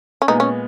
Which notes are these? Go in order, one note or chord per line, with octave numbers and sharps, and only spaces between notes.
C#4
A#2 G#3 B3 D#4
C#4